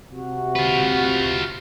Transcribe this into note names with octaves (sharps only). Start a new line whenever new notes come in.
C3 F#4
F4 B4